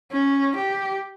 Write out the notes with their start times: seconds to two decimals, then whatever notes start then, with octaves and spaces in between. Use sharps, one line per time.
0.12 C#4
0.55 G4